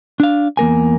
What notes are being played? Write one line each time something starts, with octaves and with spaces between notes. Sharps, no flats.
D4 F5
E2 A#3 A#4 G#5